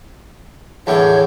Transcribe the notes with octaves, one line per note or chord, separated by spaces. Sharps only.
E2 A2 D3 C#5